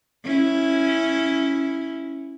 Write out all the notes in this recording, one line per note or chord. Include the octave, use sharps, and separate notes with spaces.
C#4 E4